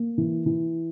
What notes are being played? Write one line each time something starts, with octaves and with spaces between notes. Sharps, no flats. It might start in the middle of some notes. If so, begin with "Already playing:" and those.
Already playing: A#3
E3
E3